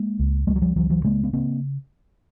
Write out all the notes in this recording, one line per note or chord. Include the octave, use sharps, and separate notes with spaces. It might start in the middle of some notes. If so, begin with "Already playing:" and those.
Already playing: G#3 A#3
C#2
C#2 G3 A3
F#3
F3 G3
C#2 E3 F#3
E3 F#3
C#3 G#3 A#3
B3
C#3 A#3 C4